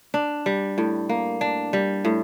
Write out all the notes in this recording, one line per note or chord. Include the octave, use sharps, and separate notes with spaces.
D4
G3
A2
A#3
D4
G3
A2